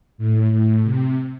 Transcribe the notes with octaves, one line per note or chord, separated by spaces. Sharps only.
A2
A2
C3